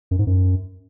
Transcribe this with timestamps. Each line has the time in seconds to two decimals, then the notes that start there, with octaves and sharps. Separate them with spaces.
0.11 F#2
0.19 G#2
0.27 F#2